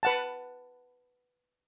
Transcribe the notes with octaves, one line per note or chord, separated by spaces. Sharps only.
B4 F#5 A5